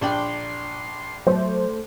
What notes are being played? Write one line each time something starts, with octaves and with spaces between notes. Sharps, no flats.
A#1 D4 G5 C6
F#3 A3 C5